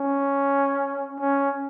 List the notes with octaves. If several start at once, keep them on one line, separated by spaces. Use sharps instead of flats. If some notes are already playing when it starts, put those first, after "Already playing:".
Already playing: C#4
C#4